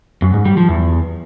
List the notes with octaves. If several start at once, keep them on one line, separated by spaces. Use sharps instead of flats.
F#2
G#2
G3
F3
E2